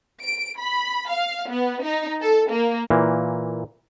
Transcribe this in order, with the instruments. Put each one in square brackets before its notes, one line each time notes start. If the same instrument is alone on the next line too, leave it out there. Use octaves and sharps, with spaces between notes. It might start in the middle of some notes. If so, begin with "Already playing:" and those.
[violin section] D7
B5
F5
B3
D#4
A4
A#3
[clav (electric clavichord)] A#2 E3 A#3